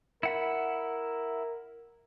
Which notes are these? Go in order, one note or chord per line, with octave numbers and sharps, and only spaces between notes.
E4 A#4 F#5 B5